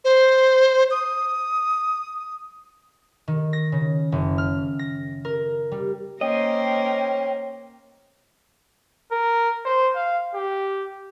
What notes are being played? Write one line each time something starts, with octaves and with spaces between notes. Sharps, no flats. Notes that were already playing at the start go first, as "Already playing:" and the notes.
C5
D#6
D#3
A#6
C#3
F#1
F6
A#6
A#4
G3
A#3 C#4 A#4 C5 D#5 G5
A#4
C5
F5
G4